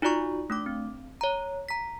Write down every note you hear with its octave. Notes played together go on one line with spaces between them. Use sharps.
D#4 F4 F#4 D5 A#5 C#6
A3 D4 D6
C4
C#5 A#5
A#5 B6